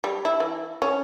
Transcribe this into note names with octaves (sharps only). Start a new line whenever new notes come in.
G3
E4
E3
C#4